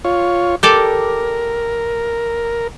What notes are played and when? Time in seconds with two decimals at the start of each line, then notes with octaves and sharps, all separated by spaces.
0.04 F4 C#5
0.63 G4 A4 A#4 D5